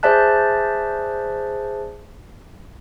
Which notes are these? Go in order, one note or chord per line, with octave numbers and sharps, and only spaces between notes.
G#4 C5 D5 E5 A5 F#6